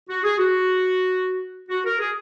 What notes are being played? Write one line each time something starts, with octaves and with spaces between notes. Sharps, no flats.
F#4
G#4
F#4
F#4
A#4
G#4